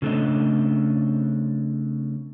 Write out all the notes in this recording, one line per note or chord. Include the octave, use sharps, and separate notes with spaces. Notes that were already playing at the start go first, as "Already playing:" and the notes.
C#3 F3 A3 C4 D4 D#5